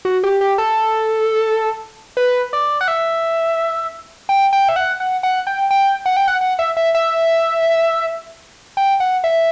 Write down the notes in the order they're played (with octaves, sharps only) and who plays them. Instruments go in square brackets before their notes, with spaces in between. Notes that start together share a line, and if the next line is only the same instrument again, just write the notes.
[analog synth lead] F#4
G4
G4
A4
B4
D5
F#5
E5
G5
G5
E5
F#5
F#5
F#5
G5
G5
F#5
G5
F#5
F#5
E5
E5
E5
G5
F#5
E5